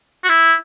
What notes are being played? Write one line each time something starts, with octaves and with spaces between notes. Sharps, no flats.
F#4
E4